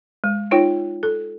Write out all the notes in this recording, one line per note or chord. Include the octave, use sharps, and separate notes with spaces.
G#3
D#4 F4 C#5 G5
A4